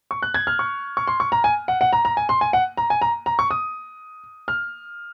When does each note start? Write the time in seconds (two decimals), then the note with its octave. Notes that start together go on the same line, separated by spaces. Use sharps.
0.11 C#6
0.22 F#6
0.34 G#6
0.47 F6
0.59 C#6
0.97 C#6
1.08 C6
1.20 C#6
1.32 A#5
1.44 G#5
1.68 F#5
1.81 F#5
1.93 A#5
2.05 A#5
2.17 G#5
2.29 C6
2.41 G#5
2.53 F#5
2.77 A#5
2.90 G#5
3.01 A#5
3.26 A#5
3.39 C#6
3.51 D#6
4.48 F6